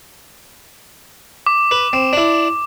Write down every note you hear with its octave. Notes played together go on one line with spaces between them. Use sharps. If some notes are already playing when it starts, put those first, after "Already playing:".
D6
B4
C4
D4 E4